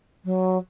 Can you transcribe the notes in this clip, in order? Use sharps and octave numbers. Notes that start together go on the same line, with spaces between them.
F#3